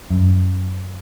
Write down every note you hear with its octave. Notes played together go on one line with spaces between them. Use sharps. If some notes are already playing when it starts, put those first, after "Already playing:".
F#2